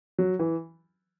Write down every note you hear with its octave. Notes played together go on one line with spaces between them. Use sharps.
F#3
E3